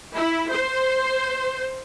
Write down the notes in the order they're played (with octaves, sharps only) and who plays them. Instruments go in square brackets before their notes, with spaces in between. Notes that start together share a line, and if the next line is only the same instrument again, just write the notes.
[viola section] E4
C5